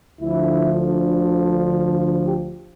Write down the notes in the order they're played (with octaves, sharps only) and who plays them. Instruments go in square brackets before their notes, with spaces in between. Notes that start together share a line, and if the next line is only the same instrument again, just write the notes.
[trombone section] D2 D3 F3 E4
F4
G4